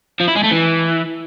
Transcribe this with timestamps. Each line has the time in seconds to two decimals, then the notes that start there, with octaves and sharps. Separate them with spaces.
0.20 F3
0.28 E4
0.36 G#3
0.44 A3
0.52 E3